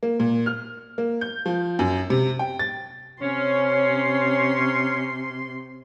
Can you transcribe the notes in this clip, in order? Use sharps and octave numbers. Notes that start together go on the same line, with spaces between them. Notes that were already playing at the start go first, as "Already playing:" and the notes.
A#3
A#2
F6
A#3
G6
F3
F#2
C3
G5
A6
C3 C#4 C6